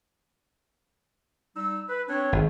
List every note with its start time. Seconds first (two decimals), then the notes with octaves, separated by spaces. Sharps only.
1.56 G3 D#4 E6
1.89 B4
2.09 C4 D4 C#5
2.32 G#1